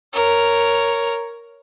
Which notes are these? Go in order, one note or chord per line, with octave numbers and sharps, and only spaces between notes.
A#4 C#5